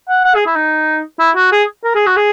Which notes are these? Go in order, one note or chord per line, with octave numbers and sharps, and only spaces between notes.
F#5
F#5
G#4
E4
D#4
E4
F#4
G#4
A#4
G#4
F#4
G#4